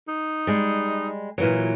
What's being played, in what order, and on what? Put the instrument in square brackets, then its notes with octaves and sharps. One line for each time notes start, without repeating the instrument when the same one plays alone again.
[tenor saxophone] D#4
[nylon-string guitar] G3 G#3
A#2 E3 F#3